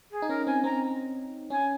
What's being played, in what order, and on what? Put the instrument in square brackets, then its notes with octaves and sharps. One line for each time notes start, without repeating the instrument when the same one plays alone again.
[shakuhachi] G#4
[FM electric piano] D#4
[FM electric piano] C#4 [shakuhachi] A#4
[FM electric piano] C4 [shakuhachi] G#5
[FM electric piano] C4 [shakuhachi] A#5
[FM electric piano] C#4 [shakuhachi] G#5